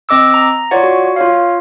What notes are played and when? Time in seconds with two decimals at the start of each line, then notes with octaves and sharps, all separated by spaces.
0.09 C4 D#5 D6 E6
0.34 A#5
0.71 F4 C#5 D5 F#5
0.83 F#4
1.16 F4 C#5 F5